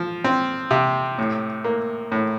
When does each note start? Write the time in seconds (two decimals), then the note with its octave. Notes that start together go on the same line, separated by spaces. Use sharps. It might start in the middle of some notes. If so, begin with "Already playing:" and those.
Already playing: F3
0.24 C4
0.71 C3
1.18 A2
1.65 A#3
2.12 A2